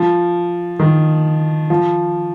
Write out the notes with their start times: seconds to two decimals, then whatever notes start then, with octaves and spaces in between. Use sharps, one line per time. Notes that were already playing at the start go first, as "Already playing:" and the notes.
Already playing: F3
0.79 D#3
1.70 F3